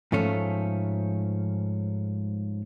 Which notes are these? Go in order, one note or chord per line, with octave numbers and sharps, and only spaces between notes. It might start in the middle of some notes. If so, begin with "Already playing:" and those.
G#2 F3 A3 C#4